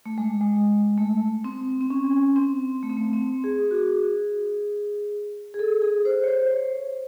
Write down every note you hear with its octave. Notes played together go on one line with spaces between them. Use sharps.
A3
G#3
G#3
A3
C4
C4
C#4
C4
A3
C4
A3
C4
G#4
F#4
G#4
G#4
A4
G#4
C5
C#5
C5
C#5